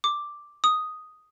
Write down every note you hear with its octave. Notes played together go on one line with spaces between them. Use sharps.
D6
D#6